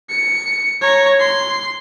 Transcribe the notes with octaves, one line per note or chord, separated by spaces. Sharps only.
C#7
C#5 A#5
C6